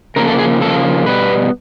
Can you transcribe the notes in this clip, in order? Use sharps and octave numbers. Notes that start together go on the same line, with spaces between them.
C#3 F3 A#3 A#4
A4
G#4
C#3 F3 A#3 A4
B2 G3 B3 B4